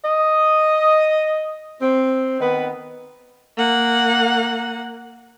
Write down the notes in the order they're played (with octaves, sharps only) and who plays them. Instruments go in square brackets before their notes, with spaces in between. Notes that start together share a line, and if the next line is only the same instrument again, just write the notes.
[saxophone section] D#5
C4
D#3 B3 B4
[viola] A#3 F#5